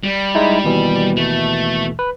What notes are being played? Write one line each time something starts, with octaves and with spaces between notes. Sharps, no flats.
G3
G#3 D#4 E4
D#2 B2 E3
A3
B4